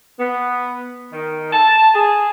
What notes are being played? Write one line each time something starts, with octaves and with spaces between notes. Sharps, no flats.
B3
D#3
A5
G#4